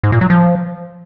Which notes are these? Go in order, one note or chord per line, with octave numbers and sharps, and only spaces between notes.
G#2
A#2
F#3
F3